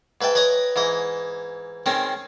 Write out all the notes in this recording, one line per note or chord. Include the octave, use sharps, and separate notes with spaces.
G#2 B4 E5 G5 A5
B4 C#5 D#5 G#5 A#5
G#2 E3 D#5
D#3 G#3 C4 C#4 D#4